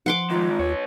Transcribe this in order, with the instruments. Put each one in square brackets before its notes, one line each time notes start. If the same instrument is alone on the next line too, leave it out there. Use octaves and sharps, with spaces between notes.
[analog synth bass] F3 [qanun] F#5 C6 D6
[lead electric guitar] D#3 G#3 [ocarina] F4
[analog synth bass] D#2 [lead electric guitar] B3 C#5